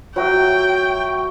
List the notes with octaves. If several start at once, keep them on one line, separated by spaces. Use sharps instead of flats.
F#3 F#4 E5 G5